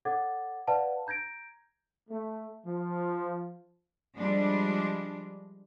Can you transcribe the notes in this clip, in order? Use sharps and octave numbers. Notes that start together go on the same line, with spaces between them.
A4 C#5 F#5 D6 G#6 A6
B4 D5 F5 F#5 A5
A#5 G6 G#6 A#6 D7
A3
F3
F3 G3 G#3 D4